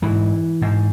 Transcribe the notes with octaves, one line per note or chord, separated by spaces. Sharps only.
G#2 E3
G#2